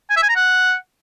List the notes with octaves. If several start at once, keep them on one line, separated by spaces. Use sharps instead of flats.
G#5
E5
G#5
A#5
F#5